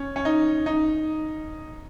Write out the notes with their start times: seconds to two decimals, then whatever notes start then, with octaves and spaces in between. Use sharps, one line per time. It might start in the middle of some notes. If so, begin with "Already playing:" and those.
Already playing: C#4
0.16 C#4
0.25 D#4
0.66 D#4